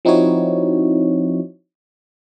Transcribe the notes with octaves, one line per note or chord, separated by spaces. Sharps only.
F3 C4 D#4 E4 F#4 C#5